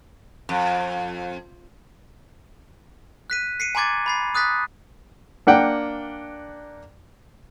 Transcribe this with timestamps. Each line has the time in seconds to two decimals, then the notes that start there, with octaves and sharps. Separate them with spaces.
0.49 F2
3.30 F#6 B6 D#7
3.60 C7 C#7 D#7
3.75 G#5 A#5 C6 D6 G#6 A6
4.06 B5 A6 C7
4.35 D#6 F#6 A6 B6
5.47 A#3 D4 F#5 G5